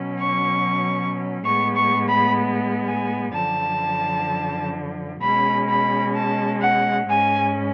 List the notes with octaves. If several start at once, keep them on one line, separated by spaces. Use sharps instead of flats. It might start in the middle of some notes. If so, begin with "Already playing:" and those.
Already playing: B2 F#3 C#4
C#6
A2 G#3 B3 C#6
C#6
B5
G#5
F#2 D3 F3 A5
B2 G#3 C#4 B5
B5
A5
F#5
G#2 G#3 C#4 G#5